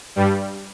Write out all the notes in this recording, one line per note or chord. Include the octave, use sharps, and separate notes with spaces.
G2 G3